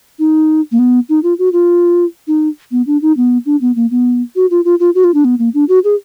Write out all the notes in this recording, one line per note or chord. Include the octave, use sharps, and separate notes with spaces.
D#4
A#3
B3
D#4
F4
F#4
F4
D#4
B3
D4
D#4
B3
D4
B3
A#3
B3
F#4
F4
F4
F4
F#4
F4
D4
B3
A#3
D4
F#4
G#4